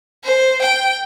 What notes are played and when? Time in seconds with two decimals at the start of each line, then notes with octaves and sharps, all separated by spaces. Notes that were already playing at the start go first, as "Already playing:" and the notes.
0.25 C5
0.63 G5